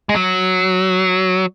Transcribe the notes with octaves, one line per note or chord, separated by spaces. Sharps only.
G#3
F#3